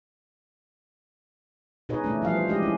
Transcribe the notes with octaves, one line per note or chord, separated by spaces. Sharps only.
B2 D#4 G#4 B4 C#5 D#5
B2 E3 A3 C#4 D4
E3 F3 G3 F5
C5
E3 G#3 D4 G4 D#5
C#4 E4